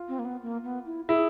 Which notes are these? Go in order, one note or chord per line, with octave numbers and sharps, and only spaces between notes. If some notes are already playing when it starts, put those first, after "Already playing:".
Already playing: F4
C4
A#3
B3
A#3
B3
E4
E4 G#4